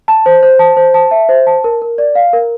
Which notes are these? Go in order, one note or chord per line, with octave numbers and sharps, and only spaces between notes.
A5
C5
C5
A5
C5
A5
E5
C5
A5
A#4
A#4
D5
F5
A#4